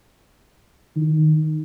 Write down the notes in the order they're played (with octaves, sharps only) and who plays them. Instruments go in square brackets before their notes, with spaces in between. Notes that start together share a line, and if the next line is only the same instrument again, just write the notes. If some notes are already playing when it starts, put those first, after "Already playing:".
[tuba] D#3